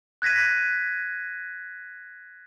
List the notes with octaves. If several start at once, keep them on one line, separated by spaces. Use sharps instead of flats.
F#6 G#6 A#6 B6 D#7